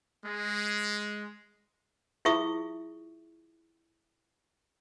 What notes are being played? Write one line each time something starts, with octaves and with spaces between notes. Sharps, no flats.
G#3
E4 F4 G#4 E5 C#6 D#6